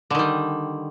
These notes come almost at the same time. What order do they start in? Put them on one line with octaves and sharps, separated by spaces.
D3 D#3 G3